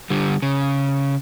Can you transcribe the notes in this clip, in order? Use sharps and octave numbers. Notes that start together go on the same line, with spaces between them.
D3 G3
C#3